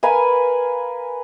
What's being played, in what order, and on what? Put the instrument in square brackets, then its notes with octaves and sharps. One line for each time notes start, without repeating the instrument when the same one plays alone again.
[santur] A#4 B4 F5 G#5